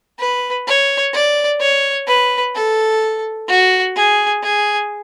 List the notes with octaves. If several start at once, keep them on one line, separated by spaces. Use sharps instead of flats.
B4
C#5
D5
C#5
B4
A4
F#4
G#4
G#4